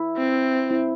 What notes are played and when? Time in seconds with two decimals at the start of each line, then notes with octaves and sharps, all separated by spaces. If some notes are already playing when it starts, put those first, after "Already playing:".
Already playing: E4
0.17 C4
0.71 E4